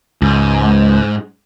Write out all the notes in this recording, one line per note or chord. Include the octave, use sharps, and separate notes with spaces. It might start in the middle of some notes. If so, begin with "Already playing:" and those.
C#2 G#2